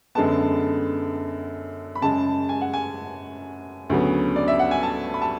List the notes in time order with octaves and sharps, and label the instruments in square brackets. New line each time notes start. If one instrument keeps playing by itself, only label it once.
[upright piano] F#2 D3 G#3 B3 A5
B5
F#2 C#3 G#3 A5
G#5
F#5
G#5
D2 C#3 F#3 B3
D5
E5
F#5
G#5
A5
B5
A5